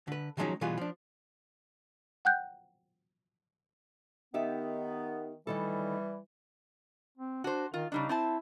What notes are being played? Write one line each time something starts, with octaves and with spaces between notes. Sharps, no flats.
D3 B4
D#3 F3 F#3 G#3 C#4 D#4
B2 E3 G3 B3 F4 G#4
F3 D4
F#5 G5 F#6 G6
D#3 B3 D#4 G4 E5
D2 D#3 E3 G3 A4
C4
D4 F#4 C5
D#3 F4
C#3 G3 D4 D#4
C4 E4 C5 A5